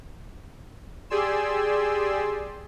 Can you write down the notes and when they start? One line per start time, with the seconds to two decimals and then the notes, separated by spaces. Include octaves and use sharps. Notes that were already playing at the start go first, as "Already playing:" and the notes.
1.10 G4 G#4 D5 G#5 C6 E6